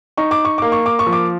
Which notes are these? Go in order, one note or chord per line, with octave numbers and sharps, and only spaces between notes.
D#4 C#6
D6
C#6
A#3 D6
C#6
D6
C#6
F3
D6